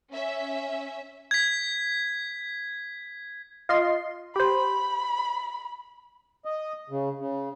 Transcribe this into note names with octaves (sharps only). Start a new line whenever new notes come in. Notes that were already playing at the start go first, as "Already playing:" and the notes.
C#4 E5
G#6 B6
F4 D#5 C6
G4 C5 B5
D#5
C#3
C#3